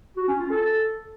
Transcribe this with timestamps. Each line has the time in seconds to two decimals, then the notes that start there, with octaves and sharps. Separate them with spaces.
0.17 F#4
0.28 C#4
0.39 F4
0.51 A4